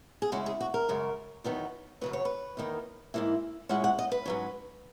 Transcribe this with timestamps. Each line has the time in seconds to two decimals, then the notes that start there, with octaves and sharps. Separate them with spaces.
0.22 G#4
0.32 C#3 G#3 C#4 E4 F#4
0.46 G#4
0.61 F#4
0.74 A#4
0.89 F#2 C#3 G#3
1.44 E2 D#3 F#3 B3 D#4
2.01 F#2 C#3 F#3 B4
2.13 C#5
2.25 B4
2.57 E2 D#3 A#3 D#4
3.14 G#2 E3 A#3 E4
3.69 A#2 G#3 C#4 E4 F#5
3.84 F#5
3.99 D#5
4.12 B4
4.25 G#2 F#3 C#4